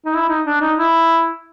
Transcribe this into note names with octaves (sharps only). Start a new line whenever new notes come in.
D#4
E4
D#4
D4
D#4
E4